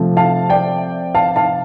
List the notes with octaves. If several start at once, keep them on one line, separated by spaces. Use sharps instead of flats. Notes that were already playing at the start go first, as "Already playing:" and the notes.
Already playing: C3 F3 A3
F5 A5
D5 G5
F5 A5
F5 A5